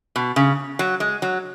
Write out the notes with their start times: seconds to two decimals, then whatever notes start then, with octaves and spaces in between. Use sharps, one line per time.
0.16 B2
0.36 C#3
0.79 F#3
1.00 G#3
1.22 F#3